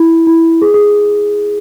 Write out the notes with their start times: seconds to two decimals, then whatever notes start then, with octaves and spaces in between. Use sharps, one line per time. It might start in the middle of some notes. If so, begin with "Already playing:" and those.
Already playing: E4
0.27 E4
0.62 G#4
0.74 G#4